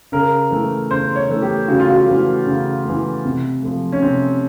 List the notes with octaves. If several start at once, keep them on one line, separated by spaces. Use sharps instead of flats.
C#3 A#4
E3 A3
C#3 C5
C#5
E3 A3
G4
C#3 F#4
F4
F#4
E3 A3
C#3
E3 A3
C3
F3 A3
C#4
C3 C4